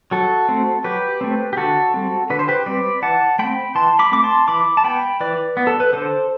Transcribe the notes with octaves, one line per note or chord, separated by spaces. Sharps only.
F#3 F#4 A4
A3 C4
F#3 G4 B4
A3 C4
G4
D3 F#4 A4
G3 C4
D3 B4
C5
G4 B4
G3 C4 B4 D5
E3 F#5 A5
A3 C4 G5 B5
E3 A5 C6
B5 D6
A3 C4 D6
A5 C6
E3 B5 D6
A5
B3 G5 B5
E3 B4 D5
B3
A4
B4
D3 A4 C5